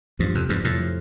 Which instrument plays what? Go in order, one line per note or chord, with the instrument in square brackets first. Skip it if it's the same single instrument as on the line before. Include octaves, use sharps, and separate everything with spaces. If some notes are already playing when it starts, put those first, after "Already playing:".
[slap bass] E2 G2 [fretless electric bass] F3
[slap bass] F2 [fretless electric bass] C3
[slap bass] E2 G2 [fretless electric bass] F3
[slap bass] F2 A2 [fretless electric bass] C3
[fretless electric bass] F3